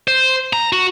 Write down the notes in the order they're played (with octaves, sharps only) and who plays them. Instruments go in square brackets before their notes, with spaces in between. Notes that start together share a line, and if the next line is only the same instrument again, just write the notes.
[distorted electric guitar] C5
A#5
F#4